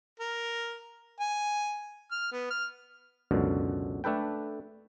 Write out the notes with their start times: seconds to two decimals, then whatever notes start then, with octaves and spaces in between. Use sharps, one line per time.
0.20 A#4
1.20 G#5
2.12 F6
2.32 B3
2.51 F6
3.31 C#2 F#2 B2 D3
4.04 A3 D4 A4 B4 G5